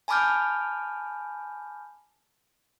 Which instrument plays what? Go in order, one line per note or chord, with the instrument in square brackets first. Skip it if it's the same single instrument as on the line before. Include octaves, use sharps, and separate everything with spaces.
[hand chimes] G#5 A5 B5 D6 F6 G6